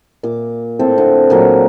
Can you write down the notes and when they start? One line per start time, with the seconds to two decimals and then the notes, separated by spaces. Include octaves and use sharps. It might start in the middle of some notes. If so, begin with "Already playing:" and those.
0.23 A#2 D6
0.79 A2 C4 A4
0.98 D3
1.30 A#2 F#3 F#4 F5